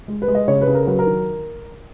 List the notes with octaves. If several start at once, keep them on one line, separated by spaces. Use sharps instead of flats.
G#3
B4
G#3
D#5
C#3 C#5
B4
C#3
A#4
F#3 B4
A#4
D#3